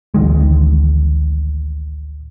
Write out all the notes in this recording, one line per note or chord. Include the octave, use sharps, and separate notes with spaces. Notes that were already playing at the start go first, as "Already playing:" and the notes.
A1 D2 D#3 G#3